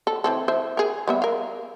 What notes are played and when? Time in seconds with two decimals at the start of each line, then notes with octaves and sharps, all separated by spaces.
0.07 A4
0.24 E3 C4 A4
0.48 C5 E5
0.77 G#4 A#4
1.08 G3 B3 E5
1.22 A#4 F5